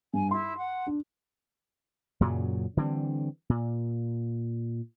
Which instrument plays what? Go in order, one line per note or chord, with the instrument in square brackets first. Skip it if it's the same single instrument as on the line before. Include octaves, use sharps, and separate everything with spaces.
[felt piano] G2 [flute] G#5
[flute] E4 [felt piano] C6
[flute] F#5
[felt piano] D4
[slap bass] F#2 A#2 C#3 F#3
D3 E3 G3 C4
A#2